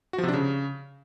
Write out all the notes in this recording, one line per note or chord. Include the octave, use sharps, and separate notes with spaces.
F#4
F3
C3
D4
C#3